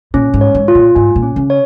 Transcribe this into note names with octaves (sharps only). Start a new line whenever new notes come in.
A#2 C#4
G#2
C#5
G#2
F4
A#2
G#2 G#5
A#2
C#4
C#3
C#5